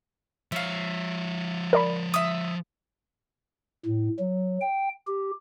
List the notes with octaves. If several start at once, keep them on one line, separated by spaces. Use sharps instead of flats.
F3 C#5 E5 F5
A#4 D5 B5
E5 D#6
A2
F#3
G5
G4